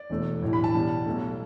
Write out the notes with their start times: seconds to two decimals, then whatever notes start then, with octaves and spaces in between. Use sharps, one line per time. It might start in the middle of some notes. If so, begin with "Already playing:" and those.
Already playing: D5
0.10 E1 E2 B2 A3
0.42 B1 A2 E3 G3
0.53 B5
0.64 A5
0.74 E2 B2 G3
1.06 B1 B2 A3